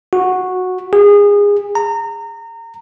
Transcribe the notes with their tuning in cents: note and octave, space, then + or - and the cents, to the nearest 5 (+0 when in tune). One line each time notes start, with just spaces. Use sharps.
F#4 -10
G#4 -25
A#5 -25